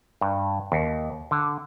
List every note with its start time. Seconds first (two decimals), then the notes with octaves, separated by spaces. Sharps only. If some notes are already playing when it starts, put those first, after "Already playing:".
0.21 G2
0.72 D#2
1.31 D3